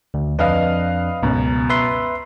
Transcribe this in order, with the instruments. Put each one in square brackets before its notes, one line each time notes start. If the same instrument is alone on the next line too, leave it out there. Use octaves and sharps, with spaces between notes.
[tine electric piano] D2
[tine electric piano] F2 D4 [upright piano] B4 D#5 F5
[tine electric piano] C#2 [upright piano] F#2 B2
[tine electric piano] B4 E5 C6